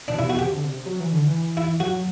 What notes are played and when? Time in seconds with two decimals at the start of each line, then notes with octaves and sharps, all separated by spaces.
0.08 B2 D4
0.18 C3 E4
0.24 B2
0.30 F#4
0.39 C3 G4
0.52 D3
0.64 C3
0.86 F#3
1.00 E3
1.13 D3
1.27 E3
1.57 E4
1.80 F#3 F#4